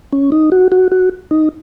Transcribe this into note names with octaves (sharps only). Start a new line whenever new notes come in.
C#4
D#4
F#4
F#4
F#4
D#4